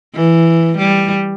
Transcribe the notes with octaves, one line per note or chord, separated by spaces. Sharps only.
E3
G3